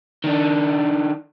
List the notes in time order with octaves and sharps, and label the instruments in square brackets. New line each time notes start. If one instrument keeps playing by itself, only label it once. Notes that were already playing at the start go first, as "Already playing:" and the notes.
[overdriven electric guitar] D#3 D4